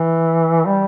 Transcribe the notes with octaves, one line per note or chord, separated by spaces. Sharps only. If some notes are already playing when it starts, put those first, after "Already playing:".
Already playing: E3
G3